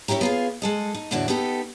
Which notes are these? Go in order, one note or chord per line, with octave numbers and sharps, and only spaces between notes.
C#4 D4 E4 G4 A#4
B3 F4 G#4
G#3 A4 D#5
D#4
E2 A2 D3 E4 F#4 D5
B3 D#4 G4 A4